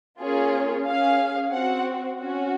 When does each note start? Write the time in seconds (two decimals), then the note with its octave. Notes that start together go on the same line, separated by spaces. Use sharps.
0.21 A#3 C#4 F4 G#4 C#5
0.87 C#4 G#4 F5
1.54 C4 F#4 F#5
2.20 C#4 F#4